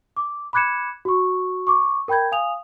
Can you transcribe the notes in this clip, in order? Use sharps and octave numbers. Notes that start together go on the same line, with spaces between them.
D6
B5 D6 F#6 G#6 C#7 E7
F#4 C#6
C#6 D6
A#4 G5 B5 G6 G#6
F5 G#5 D#6 F7